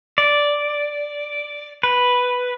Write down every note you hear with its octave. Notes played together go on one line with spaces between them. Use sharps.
D5
B4